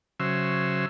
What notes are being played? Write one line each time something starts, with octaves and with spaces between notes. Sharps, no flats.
C#3 F#3 C5 E5